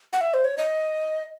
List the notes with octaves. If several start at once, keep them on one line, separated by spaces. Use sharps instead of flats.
F#5
E5
C5
C#5
D#5